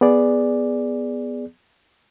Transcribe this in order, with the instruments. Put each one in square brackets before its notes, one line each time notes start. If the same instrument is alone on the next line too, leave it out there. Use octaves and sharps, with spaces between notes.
[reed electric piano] B3 G#4 D5